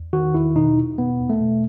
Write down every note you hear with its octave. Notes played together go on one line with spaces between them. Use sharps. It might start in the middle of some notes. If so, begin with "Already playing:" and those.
Already playing: E2
D#3 F#4
E2 E4
B2 D#4
E2
B2 B3
E2
A3
B2